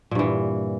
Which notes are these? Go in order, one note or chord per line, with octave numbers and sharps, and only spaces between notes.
G2 A#2 E3